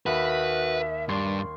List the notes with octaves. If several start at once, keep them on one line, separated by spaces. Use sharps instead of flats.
D#2 F#4 B4 E5
G2 D4 D5 C6 C#6 G#6